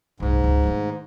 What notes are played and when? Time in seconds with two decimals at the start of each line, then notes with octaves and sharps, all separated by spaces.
0.20 F#1 C2 G#2
0.44 C#2
0.63 D#3 A3